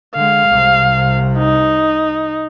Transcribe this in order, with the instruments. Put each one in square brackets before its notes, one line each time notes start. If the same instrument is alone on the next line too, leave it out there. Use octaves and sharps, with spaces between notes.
[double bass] D3 G#3 [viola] F5
[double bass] C2 C3
[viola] D#4